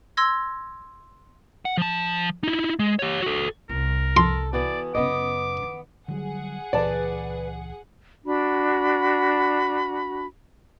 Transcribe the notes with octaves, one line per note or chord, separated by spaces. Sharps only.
C6 E6 G#6 A#6
F#5
F3 A5
D#4 E4
G#3
G4 C#5
F#4 A4
C2 A#4
A4 C6
E3 B3 F#4 D5
F#2 C#3 B3 D#5 D6
D#3
D3 F#3 G3 G#4 F#5
C#2 A#2 E3 B4 D5 A5
D4 F#4 B5